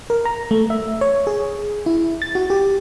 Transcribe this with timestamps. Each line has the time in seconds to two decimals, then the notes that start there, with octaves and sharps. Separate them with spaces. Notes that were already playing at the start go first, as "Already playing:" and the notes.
0.10 A#4
0.25 A#5
0.51 A3
0.70 E5
1.01 C#5
1.27 G#4
1.86 E4
2.22 A6
2.35 F#4
2.50 G4